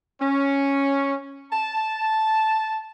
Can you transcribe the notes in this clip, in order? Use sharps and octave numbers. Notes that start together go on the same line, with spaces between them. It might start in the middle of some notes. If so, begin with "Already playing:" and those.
C#4
A5